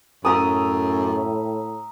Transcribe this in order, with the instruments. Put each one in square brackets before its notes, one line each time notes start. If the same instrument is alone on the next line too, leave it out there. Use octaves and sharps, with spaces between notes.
[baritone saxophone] F#2 [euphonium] A2 [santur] E5 A#5 D#6